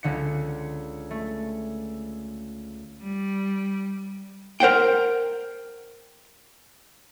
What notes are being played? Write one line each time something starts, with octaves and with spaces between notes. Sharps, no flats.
C#2 D3 C#7
A3
G3
A#4 C5 F#5 G5